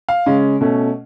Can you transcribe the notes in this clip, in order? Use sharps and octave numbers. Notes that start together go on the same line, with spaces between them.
F5
C#3 G#3 C#4
B2 A3 C#4